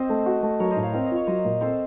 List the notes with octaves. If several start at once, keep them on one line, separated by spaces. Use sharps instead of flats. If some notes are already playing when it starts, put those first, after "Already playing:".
Already playing: C4 C5 D#5
A3
F#4
A3
F#3 A#4 C#5
C5 D#5
A2
C#5 F5
C4 F5
D#5
F4
C#5
F#3 C5 D#5
A#2
C4 A4 C5